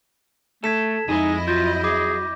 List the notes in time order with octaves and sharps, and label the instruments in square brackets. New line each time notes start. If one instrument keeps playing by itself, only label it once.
[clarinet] A3 [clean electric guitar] A4 [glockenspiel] G#6 B6 E7
[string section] F2 E4 D#5 [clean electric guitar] G#3 G#4 [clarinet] D#4
[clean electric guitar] F#3 [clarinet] F4 [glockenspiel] G6 A#6
[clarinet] G#4 [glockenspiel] D6